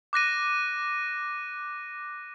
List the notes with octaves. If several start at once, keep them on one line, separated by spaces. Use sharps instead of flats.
D6 F#6 A#6 D#7